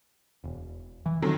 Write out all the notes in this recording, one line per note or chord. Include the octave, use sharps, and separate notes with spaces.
E1
E3
D3 D#3 F#3 C4